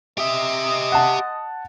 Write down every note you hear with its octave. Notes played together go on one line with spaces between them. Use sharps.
G#3 G4 D#5 E5
F#5 A5